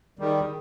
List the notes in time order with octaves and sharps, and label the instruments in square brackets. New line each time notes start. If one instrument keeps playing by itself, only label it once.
[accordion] D#3 G3 [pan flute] G#4